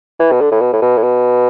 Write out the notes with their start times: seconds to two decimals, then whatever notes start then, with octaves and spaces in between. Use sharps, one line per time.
0.20 E3
0.32 B2
0.41 D3
0.52 A2
0.61 B2
0.73 A2
0.82 B2
0.98 A2
1.03 B2